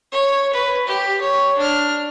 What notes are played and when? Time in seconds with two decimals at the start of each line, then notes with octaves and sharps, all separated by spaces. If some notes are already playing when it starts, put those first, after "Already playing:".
0.12 C#5
0.53 B4
0.87 G4
1.21 C#5
1.58 D4 F6